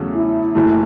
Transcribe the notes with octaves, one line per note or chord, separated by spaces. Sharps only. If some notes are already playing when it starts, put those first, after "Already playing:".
Already playing: E2 C#3 F#3 A3 C#4
E4
F#1 F#2 E3 A3